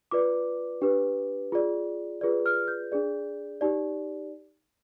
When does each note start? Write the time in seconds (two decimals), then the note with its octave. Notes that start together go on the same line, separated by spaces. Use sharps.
0.11 F4 B4 D5 D6
0.82 D4 G4 B4
1.52 F4 G#4 D5
2.21 F4 G#4 B4 D5
2.46 F6
2.68 G6
2.92 D4 G#4 D5
3.61 D#4 G4 D5